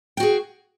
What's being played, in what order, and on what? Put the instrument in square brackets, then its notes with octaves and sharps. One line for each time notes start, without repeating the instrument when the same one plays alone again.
[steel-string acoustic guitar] G5
F#4
G#4